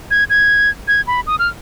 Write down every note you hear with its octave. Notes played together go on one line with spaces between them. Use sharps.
G#6
G#6
G#6
B5
D#6
F6